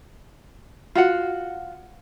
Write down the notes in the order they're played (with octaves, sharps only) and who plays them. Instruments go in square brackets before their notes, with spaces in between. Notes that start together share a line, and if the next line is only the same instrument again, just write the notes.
[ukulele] F4 F#4 F#5